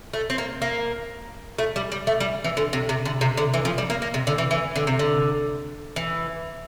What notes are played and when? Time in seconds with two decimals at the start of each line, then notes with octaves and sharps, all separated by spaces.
0.13 A3
0.30 C4
0.38 A#3
0.62 A#3
1.58 A3
1.76 G3
1.92 G3
2.07 A3
2.20 G3
2.44 E3
2.57 D3
2.73 C3
2.89 C3
3.05 D3
3.21 C3
3.37 D3
3.54 E3
3.65 F3
3.78 G3
3.90 A#3
4.02 A#3
4.14 C3
4.27 D3
4.38 E3
4.51 E3
4.76 D3
4.87 C3
4.99 D3
5.96 E3